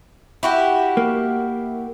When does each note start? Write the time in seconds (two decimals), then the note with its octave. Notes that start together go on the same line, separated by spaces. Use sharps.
0.43 E4 F#4 G4
0.97 A#3